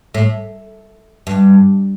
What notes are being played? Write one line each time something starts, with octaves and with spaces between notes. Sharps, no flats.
A2
G2